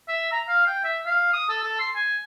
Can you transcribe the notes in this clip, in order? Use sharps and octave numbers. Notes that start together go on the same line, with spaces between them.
E5
A#5
F5
G5
E5
F5
D#6
A4
A4
C6
G#5